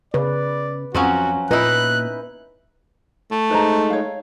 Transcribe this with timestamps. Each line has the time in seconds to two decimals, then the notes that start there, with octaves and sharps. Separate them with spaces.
0.14 C#3 B4 D5
0.95 F2 F3 F#3 C#4 F#4
1.51 A#2 D#4 E4 B4 F#6
3.31 A3
3.50 G#3 D#4 B4 C5 A#5
3.90 C#5 F5